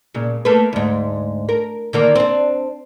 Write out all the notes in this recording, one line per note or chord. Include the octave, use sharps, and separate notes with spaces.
A#2 C#3
A3 A#3 B4
D2 G#2
A#4
D3 D#3 A#3
C4 D4